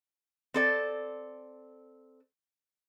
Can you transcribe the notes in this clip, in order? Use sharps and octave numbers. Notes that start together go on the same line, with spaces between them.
C4 A4 D5